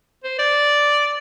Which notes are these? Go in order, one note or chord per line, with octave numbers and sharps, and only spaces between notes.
C5
D5